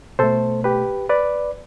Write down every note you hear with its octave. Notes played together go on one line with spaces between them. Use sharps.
B2 A3 A4 C5
G4 B4
B4 D5